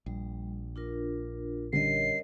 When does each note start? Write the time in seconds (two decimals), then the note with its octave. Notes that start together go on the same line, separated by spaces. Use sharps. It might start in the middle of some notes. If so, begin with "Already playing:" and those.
0.06 A#1 G3
0.76 D4 F4 A#4
1.73 D3 G3 C#4 A#4 C#5 D#5 C7